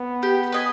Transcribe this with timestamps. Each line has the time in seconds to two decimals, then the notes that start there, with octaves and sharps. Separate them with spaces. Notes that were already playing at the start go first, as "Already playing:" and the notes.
Already playing: B3
0.23 G4
0.52 B4 D#5 G#5